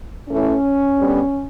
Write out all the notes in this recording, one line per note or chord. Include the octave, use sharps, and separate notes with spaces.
A2 E3 A3 C#4
D3 G3 B3